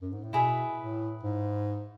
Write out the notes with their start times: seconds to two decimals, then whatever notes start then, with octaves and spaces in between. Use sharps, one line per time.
0.01 F#2
0.12 G#2
0.23 A2
0.33 B2 E4 G#4 B4 E5
0.78 A2
1.23 G#2